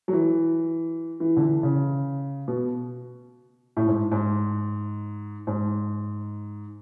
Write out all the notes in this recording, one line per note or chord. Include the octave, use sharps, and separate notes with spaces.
F#3
E3
E3
D3
E3
C#3
B2
A2
G#2
G#2
G#2